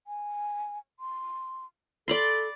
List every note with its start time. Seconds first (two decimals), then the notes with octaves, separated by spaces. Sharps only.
0.07 G#5
1.00 C6
2.08 A4 D5 B5 C6